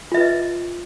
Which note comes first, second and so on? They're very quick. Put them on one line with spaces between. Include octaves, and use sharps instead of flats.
F4 E5 B4 D#5